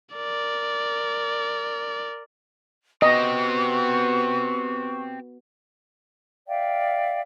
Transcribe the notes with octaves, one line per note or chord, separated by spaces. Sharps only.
A#4 D5
B3 C4 F#4 G4 D#5 C#6
D5 E5 F5 G5